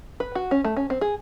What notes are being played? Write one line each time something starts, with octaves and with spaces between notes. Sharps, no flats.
B4
F#4
C#4
A3
C#4
C4
G#4